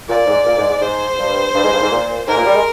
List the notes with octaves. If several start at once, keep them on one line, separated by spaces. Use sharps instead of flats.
A#2 D5
G#2
A#2
G#2
G#2
G#2 C5
G2
G2
G#2
G2
G#2
A#2
G#2 A#4
A#2
G3
G#3